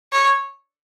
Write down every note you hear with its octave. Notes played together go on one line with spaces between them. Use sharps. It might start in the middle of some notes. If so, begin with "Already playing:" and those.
C#5